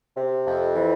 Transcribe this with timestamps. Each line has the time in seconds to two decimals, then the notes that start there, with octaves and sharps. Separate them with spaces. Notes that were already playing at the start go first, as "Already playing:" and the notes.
0.16 C3
0.46 F2
0.75 E3